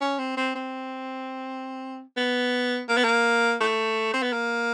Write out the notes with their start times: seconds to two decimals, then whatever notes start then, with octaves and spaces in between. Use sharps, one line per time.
0.01 C#4
0.19 C4
0.37 C4
0.55 C4
2.17 B3
2.88 A#3
2.97 B3
3.04 A#3
3.61 A3
4.14 C4
4.22 B3
4.33 A#3